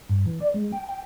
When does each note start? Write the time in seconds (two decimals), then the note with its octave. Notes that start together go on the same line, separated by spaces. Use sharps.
0.09 G2
0.26 E3
0.40 D5
0.54 G#3
0.72 G5
0.89 G5